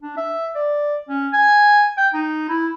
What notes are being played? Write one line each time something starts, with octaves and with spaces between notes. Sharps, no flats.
D4
E5
D5
C#4
G#5
G5
D#4
E4